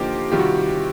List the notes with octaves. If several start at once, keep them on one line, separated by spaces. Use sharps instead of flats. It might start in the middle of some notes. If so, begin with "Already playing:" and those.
Already playing: D3 F3 A#3 D#4 F4 G4
C3 D#3 G3 F4 G4
F#4